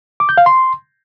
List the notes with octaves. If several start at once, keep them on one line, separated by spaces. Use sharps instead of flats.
D6
G6
F5
C6